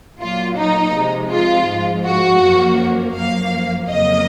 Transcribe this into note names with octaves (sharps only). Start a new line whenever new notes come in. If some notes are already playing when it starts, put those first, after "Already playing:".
A#2 F#3 A#3 F4
D#4
C3 F3 G#3
F4
G#2 F3 G#3
F#4
F#2 F3 A#3
F#2 F3 A#3 F5
F2 C#3 F#3 A#3 D#5